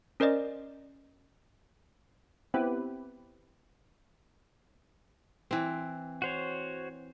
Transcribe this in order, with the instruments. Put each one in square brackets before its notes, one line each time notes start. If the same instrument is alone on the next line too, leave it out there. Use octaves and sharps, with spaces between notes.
[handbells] C#4 A#4 C5 D5 D#5
[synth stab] B3 C4 E4 G4 B4
[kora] E3 C4
[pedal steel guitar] F#4 C5 C#5